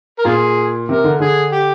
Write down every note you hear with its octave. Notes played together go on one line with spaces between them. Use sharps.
A#4
A#2 F4 G#4
C3 A#4
D3
D3 G#4
G4